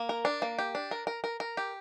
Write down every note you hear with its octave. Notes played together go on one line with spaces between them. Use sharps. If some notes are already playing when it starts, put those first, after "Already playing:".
Already playing: A#3
A#4
D4
A#3
G4
D4
A#4
A#4
A#4
A#4
G4